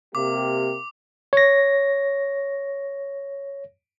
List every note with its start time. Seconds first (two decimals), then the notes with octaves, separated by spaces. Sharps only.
0.15 C3 A#3 G4 D6
1.33 C#5 A#6